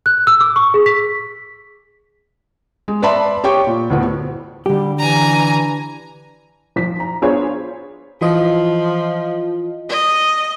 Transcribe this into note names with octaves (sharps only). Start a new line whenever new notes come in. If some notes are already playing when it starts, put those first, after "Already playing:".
F#6
E6
D6
C#6
G#4
B6
G#3
B4 D5 E5 A5 B5 C6
G4 C#5 G5 C#6
A#2
D2 A2 B3
D3 G3 G4
E3 D4 G#5 A#5
F3 B6
A#5
B3 D4 F4 G#4 C5 C#5
E3 F3 F4 D#5
D#5